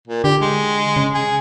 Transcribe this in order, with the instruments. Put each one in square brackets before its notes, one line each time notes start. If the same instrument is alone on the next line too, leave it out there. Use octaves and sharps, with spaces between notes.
[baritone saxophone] A#2
[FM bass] D3 [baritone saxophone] G4
[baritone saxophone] G#3
[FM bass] C#3
[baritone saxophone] G#4